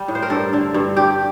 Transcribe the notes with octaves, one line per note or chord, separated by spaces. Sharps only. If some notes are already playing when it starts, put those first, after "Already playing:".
Already playing: G3
A2
C5
A#4
G2 A4
D3
G2
G2 G4